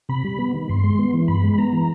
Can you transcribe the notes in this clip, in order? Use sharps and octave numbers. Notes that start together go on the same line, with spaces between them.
C3 B5
G3
B3
D#3
G2 C6
G#3
B3
E3
G2 B5
G#3
B5
B3 A#5
E3